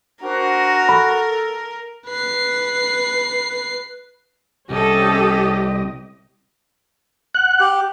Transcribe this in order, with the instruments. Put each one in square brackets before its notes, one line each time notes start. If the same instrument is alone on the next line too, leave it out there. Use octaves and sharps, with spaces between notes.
[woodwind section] D4 C5 [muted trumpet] F#4 [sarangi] A#4
[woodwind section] A4 [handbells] B5
[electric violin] B4 C7
[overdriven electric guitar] C2 [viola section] C#4 A4 [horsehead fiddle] G4 D#5
[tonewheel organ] F#5 F#6
[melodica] G4